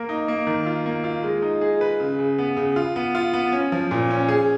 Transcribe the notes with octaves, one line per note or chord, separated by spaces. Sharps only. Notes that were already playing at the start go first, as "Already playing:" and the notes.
Already playing: A#3 A#4
D#4
A#3
D#3
F4
A#3
F4
G#3
D#4
G#4
B4
C#3
C#3
B3
C#3
F4
B3
F4
B3
C#4
F3
A#2
C#4
G#4